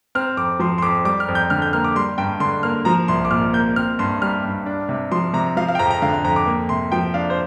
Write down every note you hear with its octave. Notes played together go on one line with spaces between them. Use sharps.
C4 F6
F2 D6
F3 C6
C6
F2 D6
G3 D6
F6
F2
G6
D3 F6
G6
A#3 F6
D6
G3 C6
G2 G5
D3 C6
A#3 F6
F3 A#5
C2 C6
D6
A#2 F6
A#3 G6
C4 F6
G2 C6
G3 F6
G2
D4
C3
F3 C6
C3 A#5
F3 F5
F5
G5
F2 A#5
A#5
D3 F5
F5
F2 A#5
D6
A#3
C3 C6
F3 G5
D4 F5
C5